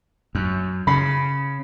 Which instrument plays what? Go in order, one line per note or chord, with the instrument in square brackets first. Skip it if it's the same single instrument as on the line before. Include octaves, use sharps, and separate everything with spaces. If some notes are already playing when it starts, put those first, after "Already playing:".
[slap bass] F#2
[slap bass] C#3 [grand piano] B5